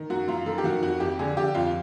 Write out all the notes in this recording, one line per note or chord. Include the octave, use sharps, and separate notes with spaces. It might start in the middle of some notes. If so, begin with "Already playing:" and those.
Already playing: D#3
F#2 F#4
F#2 F4
D#3 A4
G4
D#3 F#4
F2 F#4
F2 G4
D3 G#4
D3 G4
F2 F4